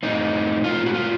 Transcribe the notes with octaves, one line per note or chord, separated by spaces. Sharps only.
A2 A3 C4 D#4
F4
F#4
F4